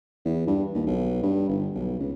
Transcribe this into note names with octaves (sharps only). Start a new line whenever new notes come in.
E2
G2
D#2
B1
G2
G1
B1
C#2